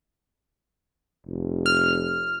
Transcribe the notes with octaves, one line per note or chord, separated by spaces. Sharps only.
F1
F6